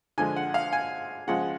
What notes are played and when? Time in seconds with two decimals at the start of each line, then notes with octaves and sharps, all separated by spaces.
0.18 D3 F3 G#3 G#5
0.36 F#5
0.54 F5
0.73 G#5
1.27 C#3 F3 G#3 F#5